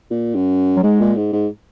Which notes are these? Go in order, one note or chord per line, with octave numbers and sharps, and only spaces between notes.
A#2
F#2
F#3
G#2 G#3
A#2
G#2
G#2